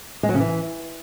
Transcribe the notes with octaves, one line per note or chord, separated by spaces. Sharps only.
G#3
F#3
C#3
E3